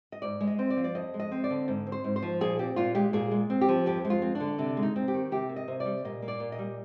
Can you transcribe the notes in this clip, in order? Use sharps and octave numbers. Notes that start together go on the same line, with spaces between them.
D#5
G#2 D5
G#3
D#5
C4
D5
F3
D5
F2 D#5
G#3
D#5
C4
D5
D3
G#2
C4
C5
G#2
C5
F3
A#2 G#4
C4 G4
A#2 F4
G#3 G4
A#2 G#4
G#3
C4
G4
F3
F2 G4
G#3
F4
C4
D4
D3
C3 D4
G#3
D#4
C4
G4
D#3
C3 G4
A#3
D#5
C3
D5
G3
A#2 D#5
A#3
D5
A#2
D#5
G3